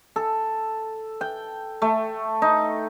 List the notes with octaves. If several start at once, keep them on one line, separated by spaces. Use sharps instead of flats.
A4
G5
A3
D#4